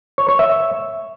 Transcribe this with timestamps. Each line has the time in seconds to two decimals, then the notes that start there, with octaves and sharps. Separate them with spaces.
0.18 C#5
0.29 C#5
0.39 E5